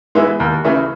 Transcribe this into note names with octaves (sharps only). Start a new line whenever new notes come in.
E3 G#3 B3 E4
D#2
C#3 E3 A3